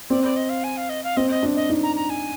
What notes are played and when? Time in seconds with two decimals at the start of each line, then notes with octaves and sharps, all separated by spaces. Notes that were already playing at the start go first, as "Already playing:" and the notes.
0.10 C4 D5
0.23 D5
0.36 D#5
0.49 F5
0.63 G#5
0.77 F5
0.89 D#5
1.03 F5
1.16 C4 D#5
1.30 D#5
1.43 D4
1.56 D#5
1.70 D#4
1.83 A#5
1.95 A#5
2.10 G#5